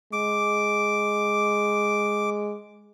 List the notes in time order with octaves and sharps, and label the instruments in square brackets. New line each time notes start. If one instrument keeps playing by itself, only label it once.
[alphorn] G#3 [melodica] D6